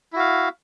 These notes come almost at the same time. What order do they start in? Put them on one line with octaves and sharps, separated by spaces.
E4 F#4 F5